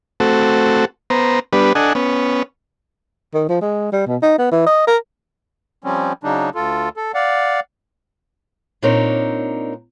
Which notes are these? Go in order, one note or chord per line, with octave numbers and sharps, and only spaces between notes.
A3 C4 F#4 A4
B3 C5 A#5
G3 B3 D4 B4
D4 A4 D#5 F#5 G#5
B3 C#4
D#3
F3
G#3
G3
B2
D#4
B3
E3
D#5
A#4
F3 G3 C4 C#4
C#3 F#3 D4 D#4
D2 F4 A4
A4
D5 F5 F#5
A#2 C4 D4 D#4 A#4 C#5